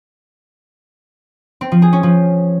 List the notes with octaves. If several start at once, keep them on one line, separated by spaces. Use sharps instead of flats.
C4
F3
G#4
C#4
F3